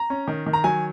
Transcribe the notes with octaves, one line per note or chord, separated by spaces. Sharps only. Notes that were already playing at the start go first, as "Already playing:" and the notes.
Already playing: A#5
C#4
D#3
D#3
A#5
F#3 G#5